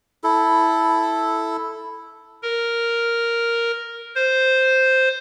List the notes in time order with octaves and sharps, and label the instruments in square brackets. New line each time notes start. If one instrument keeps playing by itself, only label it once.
[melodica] E4 A4
[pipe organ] A#4
C5